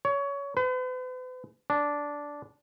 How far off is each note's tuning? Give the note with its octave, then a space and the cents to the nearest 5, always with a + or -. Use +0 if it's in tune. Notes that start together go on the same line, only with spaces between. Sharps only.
C#5 +20
B4 +45
D4 -10